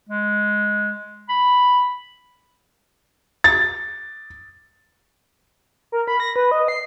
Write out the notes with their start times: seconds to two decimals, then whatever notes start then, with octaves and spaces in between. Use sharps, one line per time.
0.09 G#3
1.29 B5
3.44 A6
5.92 A#4
6.08 B5
6.20 A#6
6.36 B4
6.51 D#5
6.68 C7